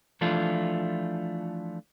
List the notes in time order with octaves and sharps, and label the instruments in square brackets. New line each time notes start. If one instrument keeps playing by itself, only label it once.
[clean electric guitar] E3 F3 A3 D4 F4